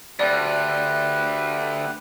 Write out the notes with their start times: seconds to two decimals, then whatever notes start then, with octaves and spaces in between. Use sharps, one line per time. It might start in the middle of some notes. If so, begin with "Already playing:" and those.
0.19 D2 G4 B4 D5 F#5